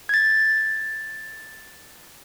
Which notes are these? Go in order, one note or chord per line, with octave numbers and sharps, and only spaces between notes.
G#6 A6